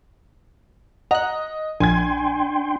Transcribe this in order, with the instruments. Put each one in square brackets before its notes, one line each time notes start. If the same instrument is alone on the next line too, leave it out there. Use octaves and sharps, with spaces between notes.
[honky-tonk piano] D#5 [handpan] F#5 [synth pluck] A#5 F#6
[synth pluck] A#1 [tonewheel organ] D4 G5 C6 [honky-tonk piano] G#5 G#6